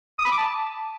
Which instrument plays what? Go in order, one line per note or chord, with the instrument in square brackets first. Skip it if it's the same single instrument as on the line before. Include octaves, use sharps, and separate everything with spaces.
[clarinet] D#6
B5
D6
A5